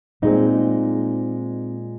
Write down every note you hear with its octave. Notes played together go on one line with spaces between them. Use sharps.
A#2 G#3 C4 D#4